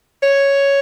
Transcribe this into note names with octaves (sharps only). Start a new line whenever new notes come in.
C#5